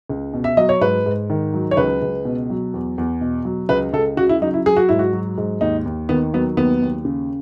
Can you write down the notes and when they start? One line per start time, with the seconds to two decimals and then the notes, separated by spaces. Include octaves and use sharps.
0.09 C#2
0.33 B2
0.44 E5
0.57 F#3 D#5
0.69 C#5
0.81 G#2 B4
1.06 G#2
1.30 D#3
1.54 F#3
1.71 C#5
1.77 C#2 B4
2.02 C#2
2.25 B2
2.50 F#3
2.74 E2
2.98 E2
3.21 B2
3.45 F#3
3.69 C#2 B4
3.93 C#2 A4
4.17 C#3 F#4
4.29 E4
4.41 F#3 D#4
4.54 E4
4.66 F#3 G#4
4.77 F#4
4.89 G#2 E4
4.99 F#4
5.13 F#3
5.38 G#2
5.61 D#2 D#4
5.85 D#2
6.09 D#3 B3
6.34 F#3 B3
6.57 D#2 B3
6.82 D#2
7.05 C#3